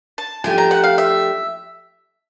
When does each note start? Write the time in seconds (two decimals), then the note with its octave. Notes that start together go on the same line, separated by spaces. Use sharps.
0.18 A5
0.44 F3 A3 D4 G4 G#5
0.58 A#5
0.71 F#5
0.84 F5
0.98 E5